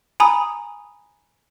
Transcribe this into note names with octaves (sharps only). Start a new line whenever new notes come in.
G#5 A#5 B5 D#6